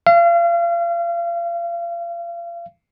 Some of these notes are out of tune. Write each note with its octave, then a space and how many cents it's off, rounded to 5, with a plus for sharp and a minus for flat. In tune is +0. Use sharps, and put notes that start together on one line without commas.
F5 -35